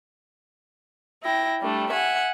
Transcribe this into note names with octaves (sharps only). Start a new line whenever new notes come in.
E4 G5 A#6
G3 A3 D4
E5 F#5 G#5